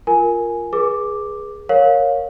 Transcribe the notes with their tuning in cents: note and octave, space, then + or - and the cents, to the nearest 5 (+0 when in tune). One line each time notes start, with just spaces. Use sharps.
F4 +0 A#4 +0 G#5 +0
G#4 +0 B4 -30 D6 +0
A#4 +0 C#5 +0 F5 +20